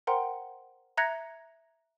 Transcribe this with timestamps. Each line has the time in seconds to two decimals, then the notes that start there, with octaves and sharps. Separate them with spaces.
0.07 A#4 C5 F#5 G5 A#5 C6
0.97 E5 A#5 F#6 G#6 A#6 C#7